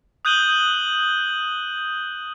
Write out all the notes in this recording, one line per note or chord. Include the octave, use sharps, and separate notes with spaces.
D#6 F#6 G6 D#7 F#7 G7